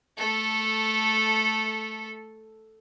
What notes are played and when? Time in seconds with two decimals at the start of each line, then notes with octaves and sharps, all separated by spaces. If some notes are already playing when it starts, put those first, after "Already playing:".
0.17 A3 A4